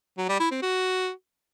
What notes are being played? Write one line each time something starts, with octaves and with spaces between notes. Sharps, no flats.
F#3
G3
E4
C4
F#4